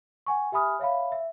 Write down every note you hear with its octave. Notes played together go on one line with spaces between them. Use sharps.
F#5 G#5 C#6
G4 E5 G#5 B5 D#6 F6
C#5 E5 F5 B5
E5